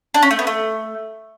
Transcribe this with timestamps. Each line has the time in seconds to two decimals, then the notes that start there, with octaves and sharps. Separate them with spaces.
0.14 D4
0.23 C#4
0.31 A3
0.39 B3
0.47 A3